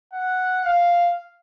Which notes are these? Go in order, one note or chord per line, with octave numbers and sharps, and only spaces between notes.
F#5
F5